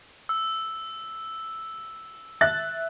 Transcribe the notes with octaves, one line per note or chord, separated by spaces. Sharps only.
E6
E5 F#6 A6